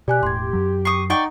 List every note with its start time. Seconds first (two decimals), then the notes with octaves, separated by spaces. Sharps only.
0.08 B2 G4 D5 G#5 F#6
0.23 E1 A2 C6 G#6
0.53 F#2 F#3
0.85 C#6 D#6 C7
1.10 D#4 D5 F#5 G5 C#6